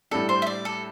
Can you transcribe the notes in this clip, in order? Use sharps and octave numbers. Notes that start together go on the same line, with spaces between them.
A2 G3 D4 A4
C5
E5
D5
A4